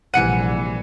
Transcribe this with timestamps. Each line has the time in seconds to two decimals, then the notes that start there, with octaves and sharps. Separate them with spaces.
0.14 A#1 C3 E3 G3 F#5 G#5 C#7 D#7